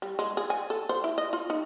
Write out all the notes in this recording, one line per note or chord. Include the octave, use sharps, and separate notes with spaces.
G3
G#3
G#4
G#5
A4
C5
E4
D#5
F4
D#4